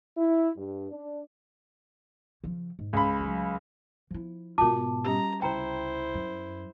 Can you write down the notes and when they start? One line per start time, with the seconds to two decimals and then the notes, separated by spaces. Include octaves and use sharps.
0.17 E4
0.57 G2
0.91 D4
2.44 C#3 F3
2.79 G#2
2.93 C#2 B5
3.20 D2 F#3
4.11 F3 E4
4.58 G#2 B2 F4 F#4 A#4 A5 D6
5.05 G3 C#4 G4 A#5
5.42 C#2 C3 E4 C5 G5 A#5
6.14 F#2